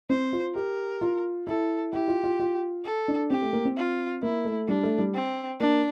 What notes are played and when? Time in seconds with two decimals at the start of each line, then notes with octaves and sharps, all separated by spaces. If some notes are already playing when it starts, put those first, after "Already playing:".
0.10 C4 C5
0.33 F4
0.55 G4 A#4
1.01 F4
1.47 E4 A4
1.93 E4 G4
2.08 F4
2.23 F4
2.39 F4
2.84 A4
3.08 D4
3.30 C4 G4
3.42 A3
3.53 A#3
3.65 C4
3.77 F4
4.23 A#3 E4
4.45 A3
4.68 G3 D4
4.83 A3
4.98 G3
5.14 C4
5.60 A#3 D4